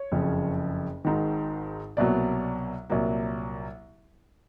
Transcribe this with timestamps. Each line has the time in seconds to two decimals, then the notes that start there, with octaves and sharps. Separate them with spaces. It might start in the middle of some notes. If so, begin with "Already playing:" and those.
Already playing: C#5
0.12 F#1 F2 C#3
1.05 G#1 G#2 D#3
1.97 C2 B2 F#3 A#3 D5
2.90 C2 A#2 F#3 A#3